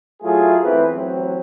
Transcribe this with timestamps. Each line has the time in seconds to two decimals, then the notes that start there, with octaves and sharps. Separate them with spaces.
0.23 F#3 A3 E4 F4 G#4
0.63 E2 A2 E3 C4 E4 B4
0.94 A1 F#3 C4